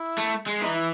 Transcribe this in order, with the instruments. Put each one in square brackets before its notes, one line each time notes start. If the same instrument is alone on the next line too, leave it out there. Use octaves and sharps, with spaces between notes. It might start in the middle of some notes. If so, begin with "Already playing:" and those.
Already playing: [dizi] E4
[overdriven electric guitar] A3
G#3
[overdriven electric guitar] E3 [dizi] D#4
[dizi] E4